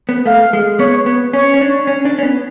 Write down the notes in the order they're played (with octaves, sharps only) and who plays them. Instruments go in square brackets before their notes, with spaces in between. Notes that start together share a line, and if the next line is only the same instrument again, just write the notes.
[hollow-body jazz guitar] B3
[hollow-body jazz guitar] A3 [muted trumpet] F5
[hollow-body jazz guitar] G#3
[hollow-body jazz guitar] B3 [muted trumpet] C#5
[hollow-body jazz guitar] B3
[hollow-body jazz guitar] C#4 [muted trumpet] C#5
[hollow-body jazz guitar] C#4
D4
C#4
D4
C#4
B3